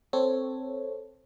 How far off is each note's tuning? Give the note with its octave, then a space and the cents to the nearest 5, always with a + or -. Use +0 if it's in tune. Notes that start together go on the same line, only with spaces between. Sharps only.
C4 +0 A4 +0 C#5 -5